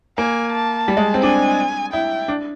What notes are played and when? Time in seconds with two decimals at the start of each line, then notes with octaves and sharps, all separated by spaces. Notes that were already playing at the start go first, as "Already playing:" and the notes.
0.18 A#3 G#5
0.52 A5
0.88 G3
0.97 G#3
1.14 C4
1.22 D4 G#5
1.93 E4 G5
2.28 D4